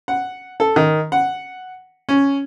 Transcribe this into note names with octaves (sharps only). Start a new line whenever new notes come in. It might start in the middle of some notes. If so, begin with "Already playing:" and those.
F#5
A4
D#3
F#5
C#4